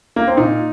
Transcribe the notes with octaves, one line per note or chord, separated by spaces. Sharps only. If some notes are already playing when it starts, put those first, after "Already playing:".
A#3
C4
A#2 D#4